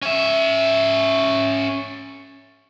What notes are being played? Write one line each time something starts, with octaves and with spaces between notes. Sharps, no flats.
C#4 E5